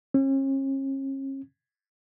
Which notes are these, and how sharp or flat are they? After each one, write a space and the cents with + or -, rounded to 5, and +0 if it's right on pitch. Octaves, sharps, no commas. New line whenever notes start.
C#4 -40